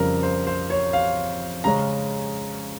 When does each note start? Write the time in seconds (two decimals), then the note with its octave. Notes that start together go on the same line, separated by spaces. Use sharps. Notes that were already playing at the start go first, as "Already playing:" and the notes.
Already playing: F2 C#3 G3 A#4
0.23 C5
0.47 C5
0.70 C#5
0.93 F5
1.64 C#3 G#3 C#4 A#5